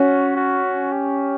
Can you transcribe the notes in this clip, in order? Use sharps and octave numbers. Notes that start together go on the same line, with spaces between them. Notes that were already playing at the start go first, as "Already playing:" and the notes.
Already playing: C#4 F#4
F#4
G4